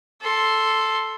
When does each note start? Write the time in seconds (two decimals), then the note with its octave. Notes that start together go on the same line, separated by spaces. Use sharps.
0.21 A4 C6